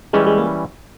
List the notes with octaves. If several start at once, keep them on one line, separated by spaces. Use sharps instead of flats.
E3 G3 G#3 C#4
G#3
A#3